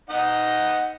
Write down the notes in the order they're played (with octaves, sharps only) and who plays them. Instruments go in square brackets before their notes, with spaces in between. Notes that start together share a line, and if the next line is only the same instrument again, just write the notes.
[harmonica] D#4 D#5 F#5